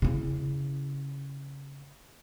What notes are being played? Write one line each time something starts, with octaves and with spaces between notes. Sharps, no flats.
C#3 E4